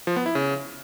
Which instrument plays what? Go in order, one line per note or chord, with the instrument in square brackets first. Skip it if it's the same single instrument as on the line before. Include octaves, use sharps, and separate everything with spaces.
[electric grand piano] F3
B3
E4
C#3